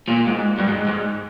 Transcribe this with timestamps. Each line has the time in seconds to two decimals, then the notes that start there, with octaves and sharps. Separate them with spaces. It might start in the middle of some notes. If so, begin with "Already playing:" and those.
0.08 A#2
0.27 G#2
0.58 G2
0.68 G#2
0.87 G#2